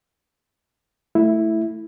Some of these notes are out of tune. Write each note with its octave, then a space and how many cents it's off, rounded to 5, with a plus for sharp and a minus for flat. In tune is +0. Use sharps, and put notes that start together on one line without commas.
A3 +0 E4 +0